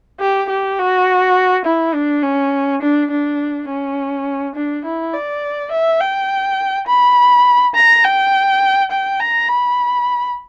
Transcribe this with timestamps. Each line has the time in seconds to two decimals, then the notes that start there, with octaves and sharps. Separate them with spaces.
0.20 G4
0.49 G4
0.78 F#4
1.65 E4
1.94 D4
2.22 C#4
2.82 D4
3.11 D4
3.69 C#4
4.55 D4
4.85 E4
5.14 D5
5.71 E5
6.00 G5
6.87 B5
7.75 A#5
8.04 G5
8.91 G5
9.20 A#5
9.49 B5